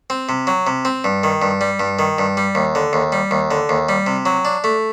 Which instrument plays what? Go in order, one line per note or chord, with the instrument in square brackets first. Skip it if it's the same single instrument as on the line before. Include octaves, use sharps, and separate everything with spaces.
[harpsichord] C4
C3
F#3
C3
C4
G2
D#3
G2
G3
G2
D#3
G2
G3
D#2
D3
D#2
G3
D#2
D3
D#2
G3
C3
F#3
D4
A3